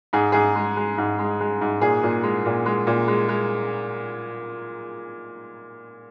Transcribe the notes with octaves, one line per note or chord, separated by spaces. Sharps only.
G#2 G#4
G#2 G#4
G#3
G#3
G#2
G#3
G#3
G#2
A#2 G#4
A#2
G#3
A#2
G#3
A#2
G#3
G#3